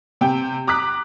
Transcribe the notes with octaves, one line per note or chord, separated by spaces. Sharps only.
C3 G5
A#5 D6 D#6 F#6 B6